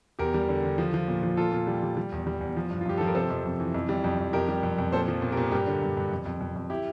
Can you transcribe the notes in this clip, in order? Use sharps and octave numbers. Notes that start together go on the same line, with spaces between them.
E2 G4 A#4
G3
D3
D3
F3
F3
A#2
F3
A#2 F4 A4
A#2
G3
G3
G3
E2
G3
E2
F3
G2
F4
G2 G4
F3 A4
A#4
C3 A4 C5
F2
F2
E3
F2
G3
F2
F2
F2 G4 A#4
G3
F2
F2
A#2 A4 C5
F3
A#2
G4 A#4
A#2
G2 G4 A#4
D3
G2
G2
F2
F2
F2
F2
E4 G4